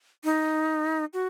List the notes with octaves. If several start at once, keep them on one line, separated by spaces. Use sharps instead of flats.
D#4
F#4